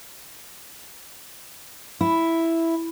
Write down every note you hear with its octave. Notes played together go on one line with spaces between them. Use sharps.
E4